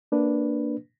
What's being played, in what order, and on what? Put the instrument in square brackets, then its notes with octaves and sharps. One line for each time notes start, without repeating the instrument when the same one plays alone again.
[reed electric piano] A#3 D4 B4